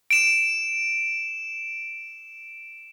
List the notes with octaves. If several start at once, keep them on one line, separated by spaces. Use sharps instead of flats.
D7 E7